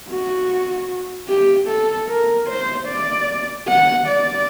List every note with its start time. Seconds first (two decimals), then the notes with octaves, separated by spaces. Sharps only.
0.09 F#4
1.29 G4
1.68 A4
2.09 A#4
2.48 C5
2.88 D5
3.68 F#5
4.08 D5